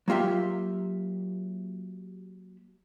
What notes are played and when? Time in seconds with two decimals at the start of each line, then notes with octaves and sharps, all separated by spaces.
0.08 F#3 A#3 F4 G4 E5